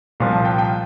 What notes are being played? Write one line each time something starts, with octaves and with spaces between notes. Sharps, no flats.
C2 A#2 F3 F5
A5
G5
G5